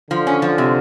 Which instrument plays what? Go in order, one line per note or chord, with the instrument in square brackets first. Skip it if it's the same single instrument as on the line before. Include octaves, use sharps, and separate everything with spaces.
[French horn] D3 [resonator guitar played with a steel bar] F3
[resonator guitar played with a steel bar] C#4
F3
C3